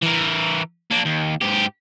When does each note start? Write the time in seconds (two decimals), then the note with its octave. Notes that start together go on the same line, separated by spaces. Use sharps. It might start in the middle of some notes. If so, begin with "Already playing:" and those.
0.02 E3 A#4
0.91 A#3 D4
1.05 D#2
1.41 G#2 G4